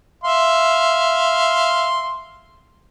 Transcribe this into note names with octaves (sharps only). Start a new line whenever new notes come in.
E5 F5 C6